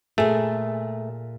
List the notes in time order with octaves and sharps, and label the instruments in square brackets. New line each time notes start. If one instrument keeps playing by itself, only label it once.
[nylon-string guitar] A#2 G#4 [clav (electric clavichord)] A3